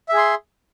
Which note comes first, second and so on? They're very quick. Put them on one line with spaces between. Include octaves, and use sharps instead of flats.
E5 G#4 C6